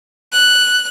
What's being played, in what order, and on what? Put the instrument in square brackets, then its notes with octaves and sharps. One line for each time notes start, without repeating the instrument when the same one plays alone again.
[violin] F#6